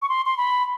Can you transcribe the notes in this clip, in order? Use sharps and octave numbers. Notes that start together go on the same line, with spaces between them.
C#6
C6
C6
B5